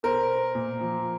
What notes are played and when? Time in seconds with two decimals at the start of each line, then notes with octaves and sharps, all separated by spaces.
0.03 B2 A#4 C5
0.55 A#2
0.81 F3